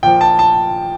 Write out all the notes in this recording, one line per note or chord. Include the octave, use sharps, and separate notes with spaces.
A#2 F3 G5
A5
A5